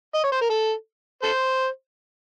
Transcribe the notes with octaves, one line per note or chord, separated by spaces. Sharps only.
D#5
C#5
C5
A#4
A4
A4 C5